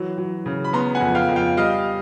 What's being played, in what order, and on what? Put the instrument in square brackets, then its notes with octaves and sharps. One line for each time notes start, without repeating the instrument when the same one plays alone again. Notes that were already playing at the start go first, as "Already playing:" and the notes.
Already playing: [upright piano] E3 F#3
F#3
C#3
B5
B3 A#5 C6
F#5 G#5
F2
F5 G5
F2
F5 G5
G3 D#5 F5